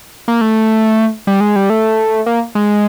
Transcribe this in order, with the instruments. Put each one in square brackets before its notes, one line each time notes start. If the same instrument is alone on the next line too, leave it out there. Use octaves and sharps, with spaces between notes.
[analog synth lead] A#3
A3
G3
G#3
G3
A3
A#3
G#3